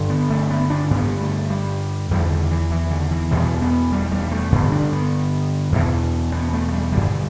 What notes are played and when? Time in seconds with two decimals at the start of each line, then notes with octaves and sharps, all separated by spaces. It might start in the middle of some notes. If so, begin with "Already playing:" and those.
Already playing: G2 D3
0.10 B3
0.30 A3
0.50 B3
0.70 D4
0.91 G2 D3 B3
1.21 A3
1.50 G3
2.11 E2 D3 G3
2.30 D3
2.51 E3
2.71 E3
2.91 D3
3.11 E3
3.31 E2 B2 G3
3.62 B3
3.92 G3
4.12 G3
4.31 A3
4.52 G2 D3 B3
4.72 D4
4.92 B3
5.72 E2 B2
6.32 B3
6.53 A3
6.68 A3
6.73 G3
6.92 G2 D3 G3